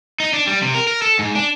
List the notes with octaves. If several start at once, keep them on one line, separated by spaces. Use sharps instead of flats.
D#4
D4
G3
C3
A#4
A#4
A4
G#2
D4